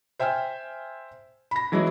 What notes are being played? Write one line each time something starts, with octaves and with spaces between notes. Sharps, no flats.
C5 E5 G5 G#5 F6
B5 A#6
E3 F#3 G#3 B3 E4